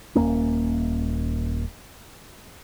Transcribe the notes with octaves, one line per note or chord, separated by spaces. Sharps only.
D#1 G#1 A#3 C#4